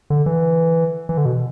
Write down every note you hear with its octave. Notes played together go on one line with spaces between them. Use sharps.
D3
E3
E3
D3
B2